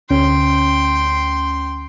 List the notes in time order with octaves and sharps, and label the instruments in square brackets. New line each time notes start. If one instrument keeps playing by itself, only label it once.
[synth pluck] D2 C#4 [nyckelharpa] G5 C6